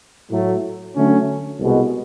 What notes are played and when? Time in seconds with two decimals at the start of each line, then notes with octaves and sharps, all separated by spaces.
0.31 A2 F#3 A3
0.95 D3 F#3 A3 C#4
1.59 C2 B2 G#3